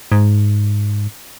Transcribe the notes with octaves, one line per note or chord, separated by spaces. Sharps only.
G#2